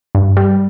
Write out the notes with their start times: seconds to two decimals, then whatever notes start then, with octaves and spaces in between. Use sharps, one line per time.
0.15 G2
0.37 G3